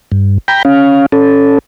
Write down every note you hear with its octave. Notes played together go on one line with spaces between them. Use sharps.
G2
G5 A#5 B5 G6
C#4 F5
C#4 A4